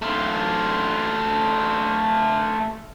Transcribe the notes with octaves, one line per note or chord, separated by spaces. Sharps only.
A3 F4